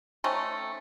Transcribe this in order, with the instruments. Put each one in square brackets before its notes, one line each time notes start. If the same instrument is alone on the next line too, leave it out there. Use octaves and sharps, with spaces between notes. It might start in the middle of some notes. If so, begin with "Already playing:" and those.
[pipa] A3 C4 C#4 D#4